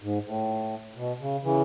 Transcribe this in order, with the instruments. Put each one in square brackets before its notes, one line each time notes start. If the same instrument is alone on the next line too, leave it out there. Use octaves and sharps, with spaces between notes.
[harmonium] G#2
A2
B2
C#3
C#3 E3